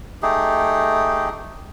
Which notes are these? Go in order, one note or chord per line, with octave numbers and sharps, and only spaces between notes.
A3 D#4 G4 G#4